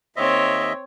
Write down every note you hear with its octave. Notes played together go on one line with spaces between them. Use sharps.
D#2 C4 C#5 D#5 E5